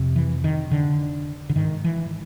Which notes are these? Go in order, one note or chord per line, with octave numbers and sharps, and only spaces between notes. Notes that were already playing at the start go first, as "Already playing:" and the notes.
Already playing: F2 C3
E3
D#3
D3
D3
G#2 D#3
E3